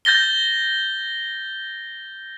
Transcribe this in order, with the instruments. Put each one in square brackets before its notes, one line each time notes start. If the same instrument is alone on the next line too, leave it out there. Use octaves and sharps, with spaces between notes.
[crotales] G6 A6 A#6 G7